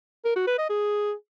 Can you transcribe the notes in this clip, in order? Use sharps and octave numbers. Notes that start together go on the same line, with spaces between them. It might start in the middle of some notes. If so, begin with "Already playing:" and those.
A#4
F#4
B4
D#5
G#4